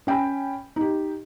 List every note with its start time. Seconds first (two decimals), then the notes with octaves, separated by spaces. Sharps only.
0.07 C#4 G5 G#5 B5
0.76 D#4 G4